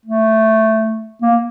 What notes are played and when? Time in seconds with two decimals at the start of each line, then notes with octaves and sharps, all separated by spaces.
0.05 A3
1.22 A#3